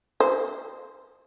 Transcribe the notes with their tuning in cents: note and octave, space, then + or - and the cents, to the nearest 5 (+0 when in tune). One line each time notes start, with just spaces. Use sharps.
C5 -15